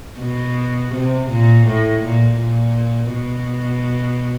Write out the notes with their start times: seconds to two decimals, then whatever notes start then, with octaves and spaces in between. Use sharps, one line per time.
0.21 B2
0.94 C3
1.31 A#2
1.67 A2
2.04 A#2
2.41 A#2
3.14 B2